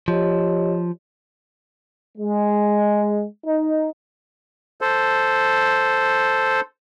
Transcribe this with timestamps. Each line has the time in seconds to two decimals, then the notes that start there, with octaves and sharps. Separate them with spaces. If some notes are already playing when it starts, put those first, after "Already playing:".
0.08 F3 G4 C#5 D#5
2.18 G#3
3.47 D#4
4.81 A4 C5